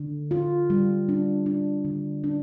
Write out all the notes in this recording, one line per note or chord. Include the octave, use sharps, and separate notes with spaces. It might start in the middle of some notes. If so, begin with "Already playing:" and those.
Already playing: D3
F4
G3
D4
D4
D3
D4